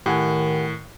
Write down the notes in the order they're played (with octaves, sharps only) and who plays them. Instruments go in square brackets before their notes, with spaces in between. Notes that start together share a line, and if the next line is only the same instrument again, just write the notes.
[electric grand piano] A2 [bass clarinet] D#3 [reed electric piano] G4 F#5 G#5